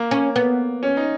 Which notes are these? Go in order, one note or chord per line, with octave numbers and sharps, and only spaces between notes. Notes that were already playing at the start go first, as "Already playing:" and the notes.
Already playing: A#3
C#4
B3
C#4
D#4